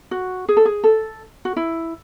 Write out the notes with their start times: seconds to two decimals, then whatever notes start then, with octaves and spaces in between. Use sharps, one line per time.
0.11 F#4
0.48 G#4
0.57 A4
0.65 G#4
0.84 A4
1.45 F#4
1.56 E4